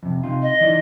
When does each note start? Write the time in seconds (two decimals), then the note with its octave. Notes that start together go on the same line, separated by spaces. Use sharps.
0.03 F2 C3
0.23 C3 D#4 F4
0.42 D#5
0.61 E3 D#4 D5